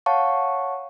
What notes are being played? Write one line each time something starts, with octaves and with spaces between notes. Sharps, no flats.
C#5 F5 F#5 A5 C#6